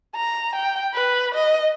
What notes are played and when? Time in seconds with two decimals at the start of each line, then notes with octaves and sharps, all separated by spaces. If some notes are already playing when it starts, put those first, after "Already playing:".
0.16 A#5
0.55 G5
0.94 B4
1.35 D#5